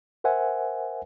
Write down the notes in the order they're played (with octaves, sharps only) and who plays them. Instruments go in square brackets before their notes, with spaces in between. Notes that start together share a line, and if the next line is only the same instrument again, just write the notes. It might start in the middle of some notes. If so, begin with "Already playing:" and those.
[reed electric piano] A#4 C5 E5 F#5 G#5